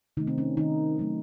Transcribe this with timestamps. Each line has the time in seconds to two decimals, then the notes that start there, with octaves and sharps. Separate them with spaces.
0.17 C3 D#3 A3 D#4
0.27 C4
0.38 C#4
0.57 D#3 D#4
0.97 D#3 F#3 A3